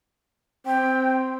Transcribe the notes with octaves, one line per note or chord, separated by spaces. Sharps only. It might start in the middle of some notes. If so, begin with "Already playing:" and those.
C4 G5